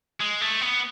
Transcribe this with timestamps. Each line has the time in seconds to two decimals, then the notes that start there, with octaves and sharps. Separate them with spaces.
0.21 G#3
0.42 A3
0.62 B3